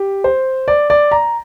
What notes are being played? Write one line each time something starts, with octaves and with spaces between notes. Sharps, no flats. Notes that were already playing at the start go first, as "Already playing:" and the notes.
Already playing: G4
C5
D5
D5
A#5